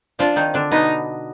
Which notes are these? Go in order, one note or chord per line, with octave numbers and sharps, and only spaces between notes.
F3 D4 F4
D#3 D#4
D3 D4
B2 B3 D#4